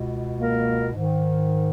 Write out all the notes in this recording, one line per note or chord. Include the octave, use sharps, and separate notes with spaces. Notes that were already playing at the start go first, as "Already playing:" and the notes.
Already playing: C#2 B2
A#3 A#4
G#2 D#3